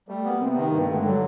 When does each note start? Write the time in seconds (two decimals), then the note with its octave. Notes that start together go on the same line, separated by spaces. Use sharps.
0.09 G3 A3
0.24 A#3 B3
0.41 C3 C4
0.49 B3
0.57 D#3
0.72 G2 A#3
0.79 G#3
0.85 D3 A3
0.97 G#3
1.05 F#3 G3